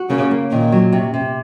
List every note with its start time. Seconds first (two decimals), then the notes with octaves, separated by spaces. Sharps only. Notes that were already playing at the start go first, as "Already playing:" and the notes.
Already playing: F#4
0.09 C#3 A#3
0.31 A#3
0.51 A#2 D#3
0.72 F#3
0.92 C3
1.14 C3